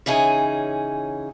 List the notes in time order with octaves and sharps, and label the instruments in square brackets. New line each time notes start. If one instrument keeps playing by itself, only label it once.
[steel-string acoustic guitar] C#3 E3 C#4 D#4 G#4 G#5